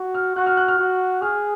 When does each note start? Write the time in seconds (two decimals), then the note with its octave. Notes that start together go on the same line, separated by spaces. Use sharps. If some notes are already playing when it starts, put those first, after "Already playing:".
Already playing: F#4
0.14 F6
0.36 F#4 F#6
0.46 F6
0.57 F#6
0.68 F6
0.79 F#4
1.21 G#4 F6